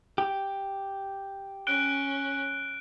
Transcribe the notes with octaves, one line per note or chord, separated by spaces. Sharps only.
G4
C#4 F#6 D7 G7